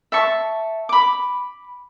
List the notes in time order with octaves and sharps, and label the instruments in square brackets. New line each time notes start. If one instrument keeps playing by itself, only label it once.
[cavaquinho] E5 A5 C#6
B5 D6